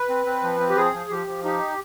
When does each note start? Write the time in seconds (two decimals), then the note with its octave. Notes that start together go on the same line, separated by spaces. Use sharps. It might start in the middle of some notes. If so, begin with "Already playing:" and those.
Already playing: B4
0.09 C4
0.26 C4
0.43 F3
0.60 C4
0.69 G4
0.77 F3 G#4
0.94 F3
1.10 F3 G4
1.27 F3
1.44 D#4 G4